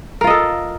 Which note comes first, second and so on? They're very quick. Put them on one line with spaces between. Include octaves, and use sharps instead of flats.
A#4 F4 D#5 A4